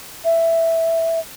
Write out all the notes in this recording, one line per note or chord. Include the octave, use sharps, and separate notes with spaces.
E5